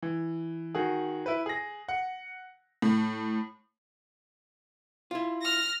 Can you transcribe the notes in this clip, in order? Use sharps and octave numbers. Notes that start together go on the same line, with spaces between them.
E3
D#3 F#4 G#4
E4 B4
G#4 A#6
F#5
A2
E4 F4
F6 A#6